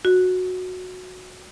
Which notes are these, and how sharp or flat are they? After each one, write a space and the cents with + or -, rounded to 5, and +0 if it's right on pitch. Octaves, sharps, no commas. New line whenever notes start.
F#4 -10